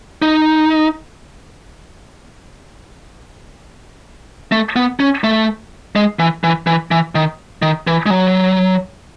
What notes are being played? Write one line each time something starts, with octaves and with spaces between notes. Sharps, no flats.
D#4
A3
B3
C#4
A3
G#3
E3
E3
E3
E3
D#3
D#3
E3
G#3
F#3